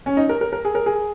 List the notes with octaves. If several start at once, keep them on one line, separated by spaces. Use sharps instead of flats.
C#4
D#4
A#4
A#4
A#4
G#4
A#4
G#4